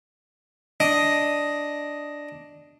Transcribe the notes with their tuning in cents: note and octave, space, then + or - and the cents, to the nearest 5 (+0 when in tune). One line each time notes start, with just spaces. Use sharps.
D4 +0 D#5 +0